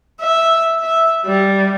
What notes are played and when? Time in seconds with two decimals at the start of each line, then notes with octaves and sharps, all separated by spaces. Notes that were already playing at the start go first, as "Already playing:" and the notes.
0.21 E5
0.83 E5
1.26 G3